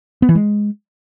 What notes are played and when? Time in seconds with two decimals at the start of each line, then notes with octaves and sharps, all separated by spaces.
0.22 B3
0.29 E3
0.35 G#3